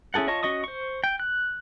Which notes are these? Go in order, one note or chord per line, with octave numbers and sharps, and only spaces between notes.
C#4 E4 G#4 A4 F#5
F4 C#5 D#5 A5 C#6
C#4 F#4 D#5 C#6 D#6
C5 C#6
G5
F#6